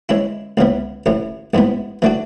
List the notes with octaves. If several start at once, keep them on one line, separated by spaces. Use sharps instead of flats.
E3 G#3 C#4 E4
C#2 C#3 E3 B3
A1 A2 E3
A1 G#2 E3 B3
E3 A3 D4 F#4